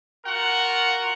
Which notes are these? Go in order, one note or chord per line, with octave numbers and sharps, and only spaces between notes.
F4 F#4 A#4 F#5